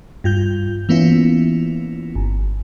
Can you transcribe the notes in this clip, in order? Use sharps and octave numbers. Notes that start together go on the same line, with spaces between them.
G2 F4 G6
E3 A#3 B3 C#4 E4 F4
G1